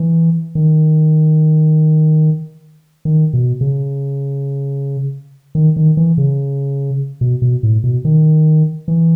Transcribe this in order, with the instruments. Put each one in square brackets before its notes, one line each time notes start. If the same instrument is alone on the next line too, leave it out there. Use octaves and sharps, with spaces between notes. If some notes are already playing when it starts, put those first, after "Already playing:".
Already playing: [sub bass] E3
D#3
D#3
B2
C#3
D#3
D#3
E3
C#3
B2
B2
A2
B2
D#3
E3